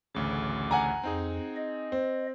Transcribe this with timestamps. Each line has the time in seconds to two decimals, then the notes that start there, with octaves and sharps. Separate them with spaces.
0.15 A1 D2 C#3 D6
0.71 F#5 G#5 A#5
1.04 F2 C4 D#4 G#4
1.56 D#5
1.92 C4